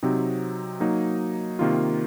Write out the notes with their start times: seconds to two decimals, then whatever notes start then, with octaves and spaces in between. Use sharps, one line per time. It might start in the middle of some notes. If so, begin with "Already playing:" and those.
0.03 C3 F#3 C4 D#4
0.80 F#3 A#3 D#4
1.59 C3 D#3 A#3 F4